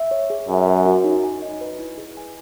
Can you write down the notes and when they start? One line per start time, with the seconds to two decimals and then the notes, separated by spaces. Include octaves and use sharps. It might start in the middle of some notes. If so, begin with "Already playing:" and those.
Already playing: E5
0.11 C#5
0.30 G#4
0.49 F#2 E5
0.67 A#4
0.86 F#4
1.04 D#4
1.24 G#5
1.42 D#5
1.61 B4
1.79 E4
1.98 G#4
2.17 G#5